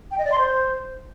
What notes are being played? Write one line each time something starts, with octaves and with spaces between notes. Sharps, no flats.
G5
D#5
D5
C6
C5